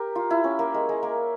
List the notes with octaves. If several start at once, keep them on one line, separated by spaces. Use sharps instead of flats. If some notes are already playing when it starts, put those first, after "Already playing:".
Already playing: G4 A#4
F4
E4
C#4
A#3
G#3
G#3
A#3